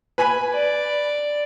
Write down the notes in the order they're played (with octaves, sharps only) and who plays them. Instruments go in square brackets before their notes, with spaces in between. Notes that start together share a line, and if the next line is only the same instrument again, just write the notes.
[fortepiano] B4 G#5 B5
[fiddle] D5